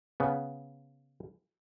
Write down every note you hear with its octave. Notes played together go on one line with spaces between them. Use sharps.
C#3 B3